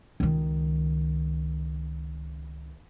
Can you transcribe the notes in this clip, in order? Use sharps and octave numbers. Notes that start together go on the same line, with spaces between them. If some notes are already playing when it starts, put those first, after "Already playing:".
C#2 D#3